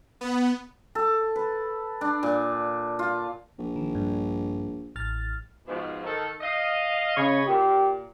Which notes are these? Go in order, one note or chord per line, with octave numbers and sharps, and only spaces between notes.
B3
A4
B4
D4
A#2
F4
A#1
D#3
G2
A1 F6 A6
G#2 B2 F3
D#3 A4
D#5 F5
C#3 C#5 D#5 B5
A#2 G4